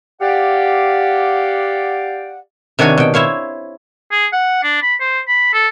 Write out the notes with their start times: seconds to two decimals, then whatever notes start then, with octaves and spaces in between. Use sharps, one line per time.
0.21 G4 D5 F5 F#5
2.79 C3 D#3 D4 F#4 C#5 G#5
2.98 B2 G5
3.14 E4 C5 C#5 F5
4.12 G#4
4.33 F#5
4.63 D4
4.82 B5
5.00 C5
5.28 B5
5.53 A4